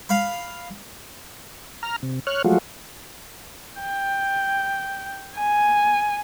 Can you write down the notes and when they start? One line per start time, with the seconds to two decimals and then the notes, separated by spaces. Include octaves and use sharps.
0.09 F5 B5
1.83 A#5 F6
2.03 C3
2.27 C#5 F6 F#6
2.44 F3 F#3 G#3 A3 F4 F#4
3.80 G5
5.38 G#5